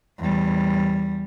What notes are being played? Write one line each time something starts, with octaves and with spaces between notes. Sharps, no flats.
E2 G3